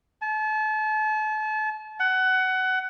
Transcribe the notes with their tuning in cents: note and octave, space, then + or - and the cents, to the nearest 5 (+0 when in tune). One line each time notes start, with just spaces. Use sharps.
A5 -35
F#5 +20